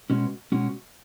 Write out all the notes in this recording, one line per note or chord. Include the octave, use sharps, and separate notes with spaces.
B2 G#3 C#4 F#4
B2 G#3 C#4 F#4